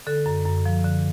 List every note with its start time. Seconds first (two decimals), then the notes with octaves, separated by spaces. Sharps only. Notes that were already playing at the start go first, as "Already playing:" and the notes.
0.07 D3 A4
0.26 F#2
0.46 F#2
0.66 F3
0.84 D3